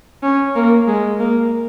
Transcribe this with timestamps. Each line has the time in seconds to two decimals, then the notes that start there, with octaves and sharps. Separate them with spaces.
0.23 C#4
0.55 A#3
0.87 G#3
1.20 A#3